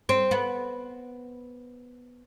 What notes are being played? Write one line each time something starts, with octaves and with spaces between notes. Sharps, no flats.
C4
B3